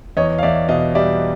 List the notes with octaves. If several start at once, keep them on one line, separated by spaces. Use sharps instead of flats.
E2 C#5 D#5
F5
E2 D5 E5
B2 D#5 F5
G3 D5 E5